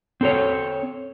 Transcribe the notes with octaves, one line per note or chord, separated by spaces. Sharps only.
C4 A4 C#5